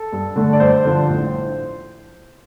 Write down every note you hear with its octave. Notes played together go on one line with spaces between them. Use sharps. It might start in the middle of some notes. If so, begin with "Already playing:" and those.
Already playing: A4
G2
D3 A3
D5
G2 C5
D3 F3
A1